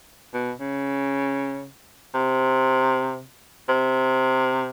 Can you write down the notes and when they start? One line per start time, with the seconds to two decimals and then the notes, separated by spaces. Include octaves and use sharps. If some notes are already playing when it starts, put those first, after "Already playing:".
0.34 B2
0.60 C#3
2.14 C3
3.69 C3